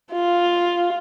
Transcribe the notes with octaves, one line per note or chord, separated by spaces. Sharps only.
F4